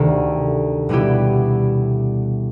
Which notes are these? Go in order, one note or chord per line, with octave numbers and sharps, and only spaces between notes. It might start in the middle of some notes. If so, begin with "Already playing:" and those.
Already playing: D2 C3 D#3
B2 G3 B3 E4 G4